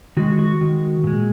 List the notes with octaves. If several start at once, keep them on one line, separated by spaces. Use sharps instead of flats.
D#3 G#3 F#4
F#4
D#3 G#3
A#2 G#3